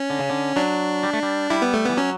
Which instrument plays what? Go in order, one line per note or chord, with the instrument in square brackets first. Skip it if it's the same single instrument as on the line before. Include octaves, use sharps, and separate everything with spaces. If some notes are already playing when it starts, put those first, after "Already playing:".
Already playing: [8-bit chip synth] C#4
[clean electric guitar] D3
C#3
D3
[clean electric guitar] F#3 [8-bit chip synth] D4
[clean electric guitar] G3
A3
G3
[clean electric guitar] G3 [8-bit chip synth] E4
[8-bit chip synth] B3
A3
[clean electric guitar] E3 [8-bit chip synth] B3
[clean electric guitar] F#3 [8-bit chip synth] C#4